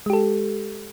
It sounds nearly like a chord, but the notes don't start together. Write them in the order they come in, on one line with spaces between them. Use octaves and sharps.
G#3 G4 A4